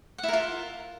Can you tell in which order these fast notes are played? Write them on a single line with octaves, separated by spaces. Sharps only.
F#5 E4 A#4 F4